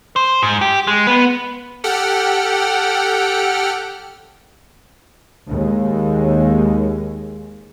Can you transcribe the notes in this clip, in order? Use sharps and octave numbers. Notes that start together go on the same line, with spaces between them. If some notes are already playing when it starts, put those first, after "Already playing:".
C5
G#2
G4
G#3
B3
G4 A4 F#5 G5 F6
D#2 G#3